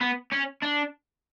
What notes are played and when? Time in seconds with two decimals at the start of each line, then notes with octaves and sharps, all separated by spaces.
0.01 B3
0.33 C#4
0.63 D4